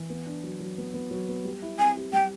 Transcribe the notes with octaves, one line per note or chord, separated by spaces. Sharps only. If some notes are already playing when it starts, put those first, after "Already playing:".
Already playing: E3
B3
D4
F#3
F#3
B3
B3
F#3
B3
G3
E4
C4 G#5
G4
G3 G5